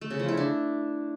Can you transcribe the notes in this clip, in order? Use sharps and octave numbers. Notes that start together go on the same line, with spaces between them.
A3
C#3
F3
E4
D4